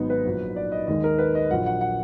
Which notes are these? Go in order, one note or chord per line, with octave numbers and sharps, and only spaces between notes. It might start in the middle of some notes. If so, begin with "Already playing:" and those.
Already playing: G#1 G#2 F#3 B3 D#4
B4
A#1 A#2 F#3
D5
D#5
D#2 D#3 G#3 D#5
A#4
B4
D#5
A#1 A#2 F#3 F#5
F#5
F#5